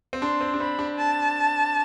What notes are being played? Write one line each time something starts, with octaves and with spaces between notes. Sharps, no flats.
C4
D4 C6
C4
D4
C4 B5
D4
A5